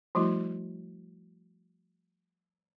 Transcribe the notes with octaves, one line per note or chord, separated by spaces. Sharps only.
F3 G3 A3 E4 F#4